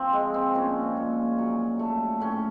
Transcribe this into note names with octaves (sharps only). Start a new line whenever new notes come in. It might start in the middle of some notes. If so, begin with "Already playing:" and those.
Already playing: F3 C4
G#3
C4
A#2 C#4
A#2
F#3
A3
A2 C#4